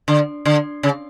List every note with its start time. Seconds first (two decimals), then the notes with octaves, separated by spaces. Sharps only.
0.08 D3
0.45 D3
0.83 C#3